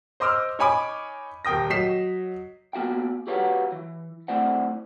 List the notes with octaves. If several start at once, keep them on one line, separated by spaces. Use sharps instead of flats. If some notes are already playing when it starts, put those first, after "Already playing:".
C5 D#5 C6 D6 E6 F6
D#4 C#5 G#5 B5 D6
D#1 A#4 G5 D#6 A#6
F#3 D#5 B6 C7 E7
A#3 B3 F#4 F5 G5
F#4 G4 B4 C#5 F5 F#5
E3
A3 C4 E4 C5 D5 F#5